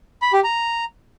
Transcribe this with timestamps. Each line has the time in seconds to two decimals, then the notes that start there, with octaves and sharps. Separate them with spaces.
0.22 B5
0.33 G4
0.44 A#5